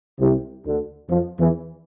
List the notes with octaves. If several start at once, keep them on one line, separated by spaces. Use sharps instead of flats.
C2 C3
D2 D3
F2 F3
E2 E3